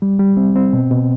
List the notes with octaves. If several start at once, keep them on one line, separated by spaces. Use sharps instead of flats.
G3
G3
C4
C4
B2
B2